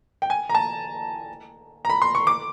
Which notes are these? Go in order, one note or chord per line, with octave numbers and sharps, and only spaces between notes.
G5
G#5
A#5
A5
A#5
B5
C6
C#6
D6